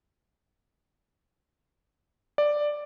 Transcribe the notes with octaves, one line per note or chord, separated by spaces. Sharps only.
D5